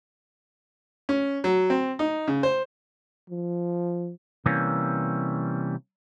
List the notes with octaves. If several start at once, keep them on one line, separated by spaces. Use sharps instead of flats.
C#4
F#3
C4
D#4
C#3
C5
F3
C3 E3 G3 A#3 C#4